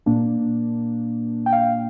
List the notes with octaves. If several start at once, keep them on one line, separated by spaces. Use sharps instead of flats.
A#2 A#3 D4
G5
F5